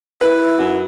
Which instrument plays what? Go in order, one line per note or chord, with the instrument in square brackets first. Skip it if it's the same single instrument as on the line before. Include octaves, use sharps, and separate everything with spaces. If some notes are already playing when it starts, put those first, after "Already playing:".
[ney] E4 [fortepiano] B4
[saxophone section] F#2 D#4 F#4